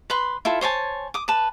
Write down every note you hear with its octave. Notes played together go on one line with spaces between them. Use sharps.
B4 B5 C6
E4 F4 A4
C5 C#5 G#5 A5
D6 D#6
B4 A5